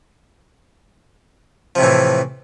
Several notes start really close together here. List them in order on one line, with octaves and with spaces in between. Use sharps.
F3 C3 A2 E3